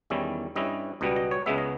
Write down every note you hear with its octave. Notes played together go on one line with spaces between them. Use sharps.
E2 D#3 G3 C#4 E4
G2 G3 C#4 E4 D#5
C#2 B2 G3 B3 D#5
D#5
C#5
C#2 C#3 G#3 B3 E5
D#5